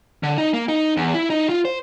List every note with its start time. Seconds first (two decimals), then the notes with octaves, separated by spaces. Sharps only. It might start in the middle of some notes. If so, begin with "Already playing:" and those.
0.23 D3
0.38 D#4
0.54 A#3
0.68 D#4
0.97 E2
1.14 E4
1.30 D#4
1.49 F4
1.65 C5